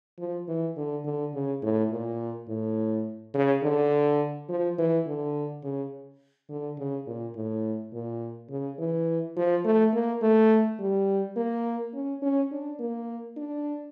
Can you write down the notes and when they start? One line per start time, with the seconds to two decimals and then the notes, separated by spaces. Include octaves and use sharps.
0.19 F3
0.48 E3
0.77 D3
1.05 D3
1.34 C#3
1.62 A2
1.91 A#2
2.48 A2
3.34 C#3
3.63 D3
4.49 F3
4.78 E3
5.06 D3
5.63 C#3
6.49 D3
6.78 C#3
7.07 A#2
7.35 A2
7.93 A#2
8.50 C#3
8.79 E3
9.36 F3
9.65 A3
9.93 A#3
10.22 A3
10.79 G3
11.37 A#3
11.94 C#4
12.22 C#4
12.51 D4
12.80 A#3
13.37 D4